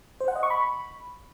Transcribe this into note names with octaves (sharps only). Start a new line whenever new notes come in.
C5
F#5
D#5
C#6
B5